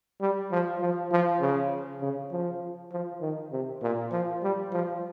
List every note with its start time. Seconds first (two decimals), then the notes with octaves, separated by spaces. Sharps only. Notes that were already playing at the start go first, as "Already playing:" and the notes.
0.21 G3
0.51 F3
0.81 F3
1.12 F3
1.41 C#3
2.01 C#3
2.32 F3
2.92 F3
3.21 D#3
3.52 C3
3.82 A#2
4.12 F3
4.43 G3
4.73 F3